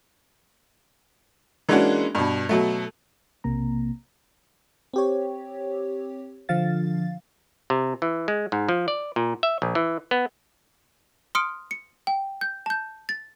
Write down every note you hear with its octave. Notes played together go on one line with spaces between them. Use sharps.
E3 G#3 A#3 C#4 D4 F#4
G2 B2
B2 F#3 A3
B1 C3 A#3 A#5
C4 G4 C#5
D3 F3 F5 A6
C3
E3
G#3
G#2
F3
D5
A#2
E5
A#1
E3
B3
C6 D#6 F6 C#7 D7
C#7
G5
G6
A5 G6
A6